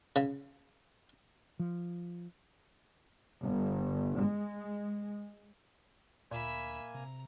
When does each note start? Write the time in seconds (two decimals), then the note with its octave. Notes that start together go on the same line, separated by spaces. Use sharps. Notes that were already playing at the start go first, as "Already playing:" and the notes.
0.16 C#3
1.59 F3
3.42 G1
4.20 G#3
6.31 D2 A#2 A#3 E5 G#5 B5
6.95 C3 A#5